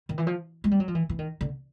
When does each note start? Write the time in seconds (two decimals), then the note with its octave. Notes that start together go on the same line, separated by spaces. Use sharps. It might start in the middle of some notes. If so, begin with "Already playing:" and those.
0.09 D#3
0.18 E3
0.27 F3
0.64 G#3
0.71 G3
0.80 F#3
0.88 F3
0.95 E3
1.09 E3
1.19 D#3
1.41 D3